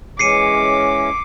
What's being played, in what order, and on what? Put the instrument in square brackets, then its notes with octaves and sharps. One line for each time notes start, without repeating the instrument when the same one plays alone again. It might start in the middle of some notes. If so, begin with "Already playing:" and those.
[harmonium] E3 G#3 C#4 [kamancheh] D6 [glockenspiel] C7 C#7 D#7